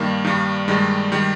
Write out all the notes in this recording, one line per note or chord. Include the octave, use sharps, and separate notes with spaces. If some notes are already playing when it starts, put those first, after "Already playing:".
Already playing: G2 D#3 G3 A#3
G2 D#3 G3
G2 D#3 G3 G#3
D#3 G3